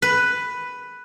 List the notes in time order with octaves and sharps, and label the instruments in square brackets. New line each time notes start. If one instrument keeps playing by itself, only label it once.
[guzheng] B4